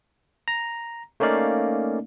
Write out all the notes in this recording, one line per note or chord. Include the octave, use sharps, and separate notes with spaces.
A#5
A3 A#3 C#4 D#4 D5 F5